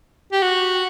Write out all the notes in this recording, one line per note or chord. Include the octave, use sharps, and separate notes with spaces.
G4
F#4